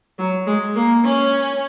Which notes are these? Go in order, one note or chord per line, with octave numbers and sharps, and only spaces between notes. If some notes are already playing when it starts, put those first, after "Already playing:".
F#3
G#3
A#3
C#4